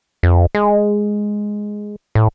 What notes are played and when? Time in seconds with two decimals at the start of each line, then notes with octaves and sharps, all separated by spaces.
0.23 F2
0.55 G#3
2.15 A2